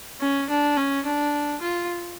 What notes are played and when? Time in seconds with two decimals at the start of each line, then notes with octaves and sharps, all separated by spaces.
0.20 C#4
0.49 D4
0.76 C#4
1.06 D4
1.61 F4